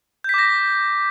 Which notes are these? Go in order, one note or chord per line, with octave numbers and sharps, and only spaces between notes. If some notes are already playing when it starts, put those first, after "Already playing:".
D6 G6 A#6 B6